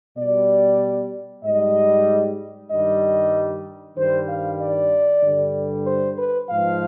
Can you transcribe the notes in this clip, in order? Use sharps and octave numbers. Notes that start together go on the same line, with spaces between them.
B2 G3 D5
G#2 G3 D#5
G2 D#3 G3 D#5
G2 D#3 G3 C5
F5
D5
G2 D3 G3
C5
B4
G#2 F3 F5